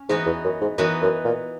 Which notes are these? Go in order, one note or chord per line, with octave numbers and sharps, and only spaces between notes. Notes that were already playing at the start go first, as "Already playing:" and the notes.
Already playing: C#4
G#2 E3 B3 D#4 F#4
E2
F#2
G#2
F#2 E3 B3 D#4 F#4
F#2
A#2